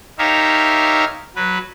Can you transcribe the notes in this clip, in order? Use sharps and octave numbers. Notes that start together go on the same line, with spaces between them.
D#4 G4 A#4 C#5 E5 F5
F#3 B4